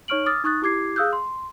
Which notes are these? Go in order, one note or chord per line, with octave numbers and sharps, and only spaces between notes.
D#4 C#5 C#6 F6 D7 F#7
D6 D#6 F6 A6
D#4 C#6 D#6 F#6 A6
E4 G4 D6 G#6 C7
G#4 F5 D#6 E6 F#6 G6
C6